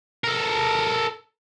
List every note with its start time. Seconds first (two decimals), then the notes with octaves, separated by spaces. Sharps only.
0.24 A4 A#4